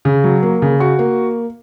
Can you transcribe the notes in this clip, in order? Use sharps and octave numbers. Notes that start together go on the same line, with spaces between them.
C#3
F#3
A#3
C#3
F#4
A#3